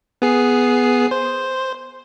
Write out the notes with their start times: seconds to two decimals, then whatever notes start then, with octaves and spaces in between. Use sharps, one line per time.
0.22 B3 G#4 C7
1.11 C5